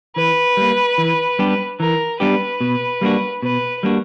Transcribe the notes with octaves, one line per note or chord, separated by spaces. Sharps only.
E3 B4
G3 A#3
E3
G3 B3 D4 G4
E3 A#4
G3 B3 D4 G4 B4
B2
G3 A#3 D4 F#4
B2 B4
G3 A#3 D4 F#4